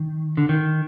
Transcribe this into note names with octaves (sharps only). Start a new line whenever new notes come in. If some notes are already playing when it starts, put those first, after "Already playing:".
Already playing: D#3
D3
D#3